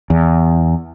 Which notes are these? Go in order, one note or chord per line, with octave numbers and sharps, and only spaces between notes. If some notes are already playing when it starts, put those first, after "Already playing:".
E2